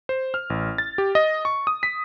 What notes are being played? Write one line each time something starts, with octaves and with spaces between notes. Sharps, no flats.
C5
F6
A1
A6
G4
D#5
C#6
D#6
B6